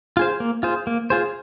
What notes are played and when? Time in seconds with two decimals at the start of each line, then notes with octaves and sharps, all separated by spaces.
0.17 F4 G#4 C5
0.40 A#3
0.63 F4 G#4 C5
0.87 A#3
1.10 F4 G#4 C5